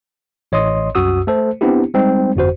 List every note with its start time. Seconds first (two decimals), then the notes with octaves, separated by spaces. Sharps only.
0.52 A1 C#5 D#5 C6 D#6
0.95 C2 F#2 F#4 D#6 E6
1.27 A3 A4 C5
1.61 B3 C4 D4 E4 G4
1.94 G3 G#3 C4 D#4
2.36 G1 F2 F#4 C5